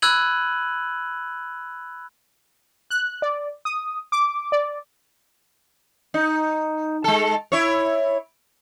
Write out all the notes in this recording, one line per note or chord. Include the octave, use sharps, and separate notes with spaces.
B5 E6 F#6 G#6 D#7 F#7
F#6
D5
D#6
D6
D5
D#4
G#3 A4
E4 C#5